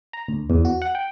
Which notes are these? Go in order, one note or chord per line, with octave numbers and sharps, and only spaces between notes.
A#5
D2
E2
F#4
F#5
G5